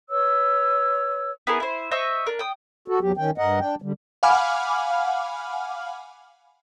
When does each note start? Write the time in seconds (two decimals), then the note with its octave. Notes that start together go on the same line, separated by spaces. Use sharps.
0.10 B4 C#5 E6
1.47 B3 E4 G#4 A#4
1.60 E4 C5
1.91 C5 D#5 E5 C#6
2.27 D4 A#4
2.39 G5 D#6
2.88 F#4 A4
3.01 E2 F#3 G4
3.17 D#3 C#4 G5
3.38 G2 A#4 D#5 F#5
3.60 D4 G5
3.82 D3 G3
4.23 F5 F#5 G#5 B5 D6 F6